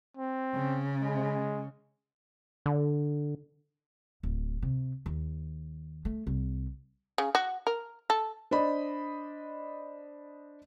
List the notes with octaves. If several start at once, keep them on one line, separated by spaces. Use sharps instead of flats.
C4
C#3
G#3
D3
D1
C3
D#2
A3
C2
C#3
F#4
A#4
A4
D4 C5 D5 D#5 B5